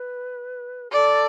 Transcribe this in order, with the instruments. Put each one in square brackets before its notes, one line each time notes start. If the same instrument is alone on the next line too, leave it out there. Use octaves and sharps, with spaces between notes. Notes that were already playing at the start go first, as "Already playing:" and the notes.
Already playing: [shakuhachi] B4
[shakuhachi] A4 [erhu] D5